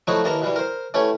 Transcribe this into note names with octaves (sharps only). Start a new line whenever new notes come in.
F3 F#3 A3 D#4 E4 F#4
D#2 E3 A#3 A5 A#5
B2 E3 G3
A#4 C5
E3 A3 C#4 G4 C#5